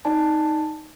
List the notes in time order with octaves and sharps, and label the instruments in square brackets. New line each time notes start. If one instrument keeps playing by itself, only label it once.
[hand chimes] D#4 D5 G#5 A5